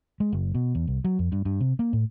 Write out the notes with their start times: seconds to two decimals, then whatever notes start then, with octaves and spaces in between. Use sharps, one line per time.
0.20 G#3
0.33 F#1
0.54 B2
0.75 E2
0.87 C2
1.04 F#3
1.19 F2
1.32 G2
1.45 G2
1.60 C3
1.79 A#3
1.93 A2